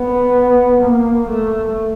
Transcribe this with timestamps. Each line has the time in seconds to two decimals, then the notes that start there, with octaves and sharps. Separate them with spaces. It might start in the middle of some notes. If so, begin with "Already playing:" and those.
Already playing: B3
0.82 A#3
1.29 A3